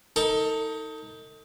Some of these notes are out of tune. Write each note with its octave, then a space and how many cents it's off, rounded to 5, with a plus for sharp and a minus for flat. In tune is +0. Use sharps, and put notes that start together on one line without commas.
D#4 +25 A4 +35